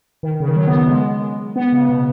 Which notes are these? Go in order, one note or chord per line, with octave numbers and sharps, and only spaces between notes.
D#3
C#3
D#3
F#3
B3
B3
G#3
B3
C#3
B2